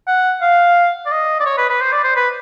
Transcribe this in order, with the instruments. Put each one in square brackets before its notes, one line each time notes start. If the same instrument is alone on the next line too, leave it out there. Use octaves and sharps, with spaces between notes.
[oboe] F#5
F5
D5
D#5
D5
C#5
B4
B4
C5
D5
C5
B4